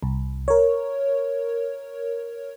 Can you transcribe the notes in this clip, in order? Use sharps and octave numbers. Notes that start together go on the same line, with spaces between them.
C2
A#4 C#5